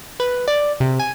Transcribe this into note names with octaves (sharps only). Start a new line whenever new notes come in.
B4
D5
C3
G#5